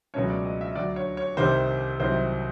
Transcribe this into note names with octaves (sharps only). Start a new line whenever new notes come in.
C#2 B2 F#3 A3 C#4 C#5
D5
D#5
E5
D2 D3 F#3 D5
C#5
C#5
C2 C3 D#3 G3 C5
C2 C3 D#3 F#3 C5